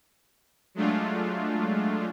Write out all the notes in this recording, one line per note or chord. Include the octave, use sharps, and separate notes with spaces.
F#3 G#3 A3 D4 F4